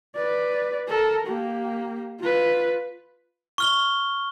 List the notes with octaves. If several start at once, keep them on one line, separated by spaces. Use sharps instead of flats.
B4 D5
A4 A#4
A#3 G4
F4 B4
C#6 F6 G7